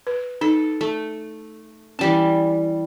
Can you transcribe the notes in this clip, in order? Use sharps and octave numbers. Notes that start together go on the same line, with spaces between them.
B4
D#4 A4
A3
E3 G3 C#4 A5